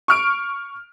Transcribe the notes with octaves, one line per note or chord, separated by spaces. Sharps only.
C#6 F6 D7